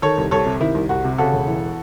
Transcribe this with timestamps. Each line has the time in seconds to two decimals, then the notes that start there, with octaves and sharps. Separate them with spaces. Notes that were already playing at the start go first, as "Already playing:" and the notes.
0.02 D#3 A4 C#5
0.18 C2
0.31 C2 A4 C#5
0.46 C3
0.60 D#3 E4
0.75 C2
0.89 C2 F#4
1.04 C3
1.18 C#3 F#4 A4
1.33 E1
1.48 E3